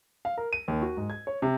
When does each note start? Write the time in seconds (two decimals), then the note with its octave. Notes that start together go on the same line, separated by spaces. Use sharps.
0.25 F5
0.38 A#4
0.53 D#7
0.68 D#2
0.82 F#4
0.97 G#2
1.10 G#6
1.27 C#5
1.42 C3